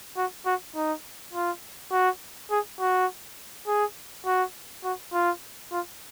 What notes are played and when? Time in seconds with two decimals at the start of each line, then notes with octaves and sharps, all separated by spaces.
0.17 F#4
0.46 F#4
0.75 D#4
1.34 F4
1.92 F#4
2.50 G#4
2.80 F#4
3.67 G#4
4.26 F#4
4.84 F#4
5.13 F4
5.71 F4